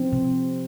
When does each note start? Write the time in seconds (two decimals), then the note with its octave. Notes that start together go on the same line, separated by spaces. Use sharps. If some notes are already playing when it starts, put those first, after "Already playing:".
Already playing: F3 C4
0.13 C3